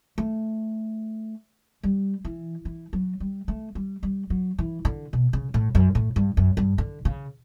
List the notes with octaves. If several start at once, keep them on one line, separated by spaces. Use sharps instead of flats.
A3
G3
E3
E3
F#3
G3
A3
G3
G3
F#3
E3
D3
B2
C#3
A2
F#2
A2
G2
F#2
G2
D3
C#3